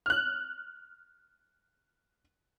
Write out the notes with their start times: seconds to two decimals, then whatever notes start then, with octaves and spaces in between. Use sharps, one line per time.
0.06 F6 F#6